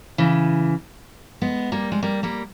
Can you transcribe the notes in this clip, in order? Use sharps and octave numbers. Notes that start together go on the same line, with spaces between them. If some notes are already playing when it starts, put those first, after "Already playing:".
C#3 E3
G#3 B3
G3 A#3
G#3
G3 A#3
G3 A#3